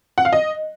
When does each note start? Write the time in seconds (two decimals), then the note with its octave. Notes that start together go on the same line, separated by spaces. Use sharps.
0.18 F#5
0.25 F5
0.33 D#5